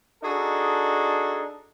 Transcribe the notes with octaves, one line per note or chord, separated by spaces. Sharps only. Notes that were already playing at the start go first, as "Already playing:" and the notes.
D4 D#4 F#4 G#4 A4 D#5